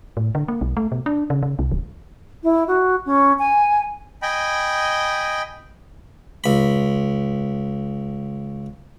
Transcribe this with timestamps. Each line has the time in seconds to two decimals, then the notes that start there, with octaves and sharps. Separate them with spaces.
0.17 A2
0.35 D3
0.48 A#3
0.61 B1
0.77 A3
0.92 B2
1.06 D4
1.30 C#3
1.43 C#3
1.59 C2
1.72 D1
2.43 E4
2.67 F#4
3.05 C#4
3.38 G#5
4.22 D#5 G5 G#5 B5
6.44 C#2 B5